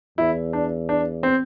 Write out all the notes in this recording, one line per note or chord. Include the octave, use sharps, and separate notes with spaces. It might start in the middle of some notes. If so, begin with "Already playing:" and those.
E2 E4
D4
D4
C4